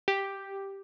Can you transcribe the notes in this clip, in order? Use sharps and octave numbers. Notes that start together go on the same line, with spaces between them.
G4